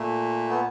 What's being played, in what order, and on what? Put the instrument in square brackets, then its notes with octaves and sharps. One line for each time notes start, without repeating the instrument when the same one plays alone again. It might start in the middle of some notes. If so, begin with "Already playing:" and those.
Already playing: [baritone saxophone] A#2 [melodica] A3
[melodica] B3